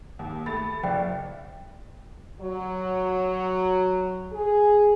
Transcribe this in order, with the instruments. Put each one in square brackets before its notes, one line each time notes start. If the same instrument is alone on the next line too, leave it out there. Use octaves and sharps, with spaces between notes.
[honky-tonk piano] D#2
[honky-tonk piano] A3 A6 [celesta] B5
[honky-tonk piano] F#1 [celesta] D5 G5
[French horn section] F#3
G#4